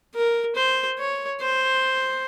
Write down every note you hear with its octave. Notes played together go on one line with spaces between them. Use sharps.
A#4
C5
C#5
C5